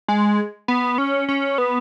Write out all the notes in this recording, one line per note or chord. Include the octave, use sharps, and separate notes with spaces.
G#3
B3
C#4
C#4
B3